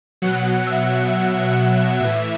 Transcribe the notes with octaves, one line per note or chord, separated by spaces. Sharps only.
B2 F#3 F#5
E5
F#5
A2 E3 E5